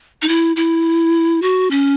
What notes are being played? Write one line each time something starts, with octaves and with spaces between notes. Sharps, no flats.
D#4
E4
E4
F#4
C#4